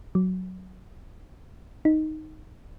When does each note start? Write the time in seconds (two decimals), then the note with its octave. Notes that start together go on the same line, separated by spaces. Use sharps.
0.15 F#3
1.85 D#4